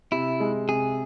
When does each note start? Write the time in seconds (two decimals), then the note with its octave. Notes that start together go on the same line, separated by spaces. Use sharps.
0.12 C3 E4
0.40 G#3
0.69 C3 G#4